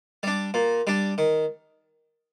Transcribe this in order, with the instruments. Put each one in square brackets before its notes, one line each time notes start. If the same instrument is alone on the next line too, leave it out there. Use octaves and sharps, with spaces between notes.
[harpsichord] G3 D4
A#2
G3 D4
D#3